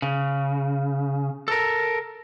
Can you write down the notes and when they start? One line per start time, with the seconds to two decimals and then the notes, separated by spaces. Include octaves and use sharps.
0.02 C#3
1.48 A4 A#4